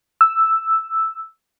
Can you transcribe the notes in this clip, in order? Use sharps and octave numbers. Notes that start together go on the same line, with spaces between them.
E6